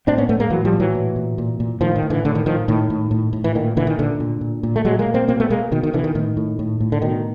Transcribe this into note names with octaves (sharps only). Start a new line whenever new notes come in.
A2 C4 D4
B3 C#4
A2 A3 B3
G#3 A#3
A2 E3 F#3
F3 G3
A2
E3 F#3
A#2
A#2
A#2
A#2
A2 D#3 F3
D#3
A2
D3 E3
A2 D3
D#3
A2 D#3 F3
A2 D#3
A2
A2
A2
E3
A#2 D#3
A#2 D3 E3
D#3
A#2 D3
A#2
A#2
A#2
A3
A#2 F#3 G#3
G#3 A#3
A#2
A#3 C4
B2 A#3 C4
A3 B3
B2 G#3 A#3
B2 D#3
D#3
B2 D3 E3
D#3
A2 D#3
A2
A2
A2
D3
B2 D#3